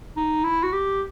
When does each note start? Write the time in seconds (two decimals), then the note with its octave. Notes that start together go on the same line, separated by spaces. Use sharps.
0.16 D#4
0.44 E4
0.63 F#4
0.73 G4